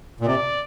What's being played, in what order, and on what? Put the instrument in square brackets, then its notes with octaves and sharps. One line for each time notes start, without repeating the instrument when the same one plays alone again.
[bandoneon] A#2
[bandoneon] C3 [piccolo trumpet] D5